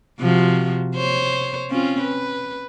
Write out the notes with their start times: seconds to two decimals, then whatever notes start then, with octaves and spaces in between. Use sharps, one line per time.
0.19 C3 F3 F#4
0.95 C5 C#5
1.70 C4 C#4 F4
2.01 B4